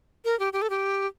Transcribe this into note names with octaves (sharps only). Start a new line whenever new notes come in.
A#4
G4
G4
A4
G4